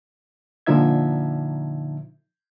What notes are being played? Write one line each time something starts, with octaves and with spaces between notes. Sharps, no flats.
A#2 D3 F3 D#4 E5 G#6